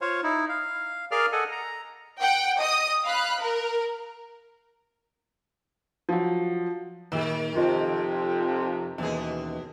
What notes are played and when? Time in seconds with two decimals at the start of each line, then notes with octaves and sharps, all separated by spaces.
0.01 F4 C5 C#5 F5
0.23 D#4 E4
0.49 F5
1.11 G#4 A#4 D5 F5 F6
1.32 A4 D#5 F#5 G#5
1.52 A#5
2.20 F#5 G5
2.60 D#5 D#6
3.04 F5 B5 F#6
3.41 A#4
6.09 F3 F#3
7.12 A#2 D#3 G#4
7.56 F2 C3 F4 D#5
8.98 D#2 B2 E3 C#4 G#4